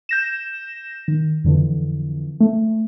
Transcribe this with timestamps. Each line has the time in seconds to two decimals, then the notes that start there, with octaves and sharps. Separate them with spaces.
0.09 G6 A#6 E7
1.08 D#3
1.44 F2 D3 E3
2.40 A3